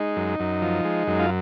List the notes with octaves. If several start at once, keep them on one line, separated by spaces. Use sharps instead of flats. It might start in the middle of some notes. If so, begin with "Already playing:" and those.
Already playing: G#3 D#4
F#2
F#2
F3
G#3
F#2
F4